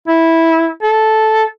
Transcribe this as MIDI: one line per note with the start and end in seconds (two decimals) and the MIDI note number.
0.08 0.69 64
0.83 1.45 69